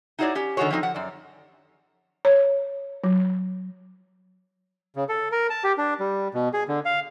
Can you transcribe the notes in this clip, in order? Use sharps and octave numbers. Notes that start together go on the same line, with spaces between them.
D#4 E4 F#4 G#4 C#5 D5
C#4 G4
D3 D#3 G#3 F#4 G#4 C#5
F3 F#3 C4 D#4
F3 F#5
F#2 D5
C#5
F#3
C#3
A4
A#4
A5
G4
D4
G3
B2
G#4
D3
F5